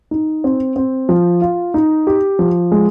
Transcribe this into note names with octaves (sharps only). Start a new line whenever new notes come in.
D#4
C4
C4
F3
F4
D#4
G4
F3
G#3